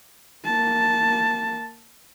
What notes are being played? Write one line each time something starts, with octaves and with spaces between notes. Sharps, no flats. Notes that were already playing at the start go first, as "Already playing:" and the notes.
A#3 A5